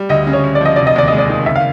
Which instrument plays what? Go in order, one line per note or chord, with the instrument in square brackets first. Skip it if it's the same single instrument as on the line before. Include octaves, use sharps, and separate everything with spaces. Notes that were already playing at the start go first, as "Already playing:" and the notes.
Already playing: [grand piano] G3
[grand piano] D2 [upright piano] D#5
[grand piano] C#3
[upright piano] C#5
[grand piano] D2
[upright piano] D5
[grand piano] F3 [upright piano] D#5
[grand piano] F1 [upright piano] D5
[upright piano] D#5
[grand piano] D#2 [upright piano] D5
[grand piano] G#3 [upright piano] D#5
[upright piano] D5
[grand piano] D#3
[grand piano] F#1 [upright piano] E5
[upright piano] F5